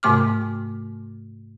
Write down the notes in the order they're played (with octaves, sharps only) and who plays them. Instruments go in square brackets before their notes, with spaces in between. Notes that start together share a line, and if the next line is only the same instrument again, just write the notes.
[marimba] G#2 C3 A3 D6 F6